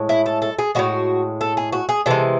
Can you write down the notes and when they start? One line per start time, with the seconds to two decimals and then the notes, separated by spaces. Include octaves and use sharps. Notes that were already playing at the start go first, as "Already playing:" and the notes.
Already playing: A2 G#3
0.09 E4
0.26 A4
0.42 A4
0.59 G#4
0.75 A2 E3 G#3 F#4
1.41 A4
1.57 G#4
1.73 F#4
1.89 G#4
2.06 C3 E3 G#3 A4